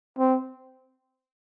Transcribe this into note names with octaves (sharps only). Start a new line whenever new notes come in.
C4